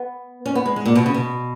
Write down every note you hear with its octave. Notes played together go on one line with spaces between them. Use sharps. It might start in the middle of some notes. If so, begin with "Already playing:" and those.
Already playing: B3
C#4
B3
G#3
G#3
A#2
B2
C#3
B2